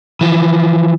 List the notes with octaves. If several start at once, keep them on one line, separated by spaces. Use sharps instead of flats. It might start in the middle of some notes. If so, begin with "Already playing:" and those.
E3 F3